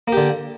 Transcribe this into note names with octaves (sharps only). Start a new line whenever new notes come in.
D3 A#3 G4